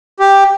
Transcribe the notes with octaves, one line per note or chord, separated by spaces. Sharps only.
G4